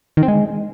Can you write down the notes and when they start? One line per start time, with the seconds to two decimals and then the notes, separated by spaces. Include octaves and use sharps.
0.17 D#3
0.23 C4
0.28 G#3